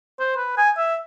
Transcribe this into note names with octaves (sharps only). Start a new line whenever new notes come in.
C5
B4
G#5
E5